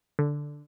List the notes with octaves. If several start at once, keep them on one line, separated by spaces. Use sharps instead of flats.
D3